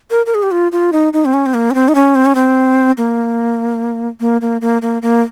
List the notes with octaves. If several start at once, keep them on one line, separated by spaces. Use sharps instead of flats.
A#4
A#4
G#4
G4
F4
F4
D#4
D#4
C4
C#4
C4
A#3
C#4
C4
D#4
C#4
C4
C#4
C4
A#3
A#3
A#3
A#3
A#3
A#3